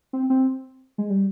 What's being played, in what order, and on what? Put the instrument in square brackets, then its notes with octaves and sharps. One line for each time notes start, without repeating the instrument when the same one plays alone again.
[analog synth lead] C4
C4
G#3
G3